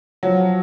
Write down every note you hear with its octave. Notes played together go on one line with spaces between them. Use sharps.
F3 F#3 F#4